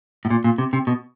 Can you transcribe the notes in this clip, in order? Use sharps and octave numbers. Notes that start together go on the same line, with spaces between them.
A2
A#2
A#2
C3
C3
B2